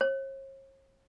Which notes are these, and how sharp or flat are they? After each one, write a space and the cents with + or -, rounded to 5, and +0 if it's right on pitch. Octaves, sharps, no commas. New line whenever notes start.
C#5 -45